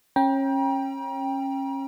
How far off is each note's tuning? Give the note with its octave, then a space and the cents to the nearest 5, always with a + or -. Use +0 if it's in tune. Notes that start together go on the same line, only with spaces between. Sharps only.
C#4 -25 G5 +10 A#5 +40